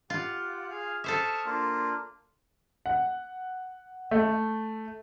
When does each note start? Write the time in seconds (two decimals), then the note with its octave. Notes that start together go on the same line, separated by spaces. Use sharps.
0.10 F4 G4 F#5
0.70 G#4 F5
1.04 A4 C5 E5 C#6 D#6 F6
1.46 A#3 D4 F4
2.86 F#5
4.11 A3